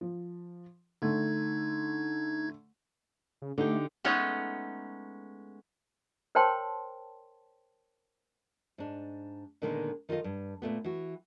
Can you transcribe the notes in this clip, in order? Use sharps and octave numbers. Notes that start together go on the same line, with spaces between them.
F3
D3 A3 D#4 G#6
C#3
D3 A3 D#4 G4
G#3 A3 B3 C#4 D#4
A#4 C5 C#5 G5 A5 C6
G#2 D4
A#2 D3 D#3 G#3 A#3 B3
D#3 F4 A4 D#5 F5
G2
A#2 A3 B3
E3 F#4